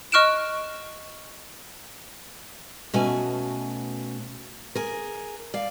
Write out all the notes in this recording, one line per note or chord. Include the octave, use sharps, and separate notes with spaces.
D#5 C#6 F6 F#6 D7 E7
B2 A3 C#4 F#4 G#5
G#4 A#4
D5 F5